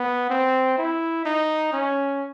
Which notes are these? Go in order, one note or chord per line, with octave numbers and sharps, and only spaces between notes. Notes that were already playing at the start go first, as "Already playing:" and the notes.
Already playing: B3
C4
E4
D#4
C#4